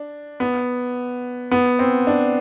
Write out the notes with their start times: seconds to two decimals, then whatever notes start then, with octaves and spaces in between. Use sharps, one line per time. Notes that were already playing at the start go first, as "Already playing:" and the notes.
Already playing: D4
0.40 B3
1.51 B3
1.79 C4
2.07 D4